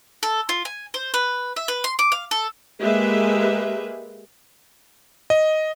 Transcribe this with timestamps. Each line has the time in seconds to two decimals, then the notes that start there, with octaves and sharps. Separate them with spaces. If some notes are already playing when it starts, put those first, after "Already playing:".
0.23 A4
0.49 F4
0.65 G#5
0.94 C5
1.14 B4
1.56 E5
1.68 B4
1.84 C6
1.99 D6
2.12 F5
2.31 A4
2.80 G#3 A#3 G4 G#4 B4 E5
5.30 D#5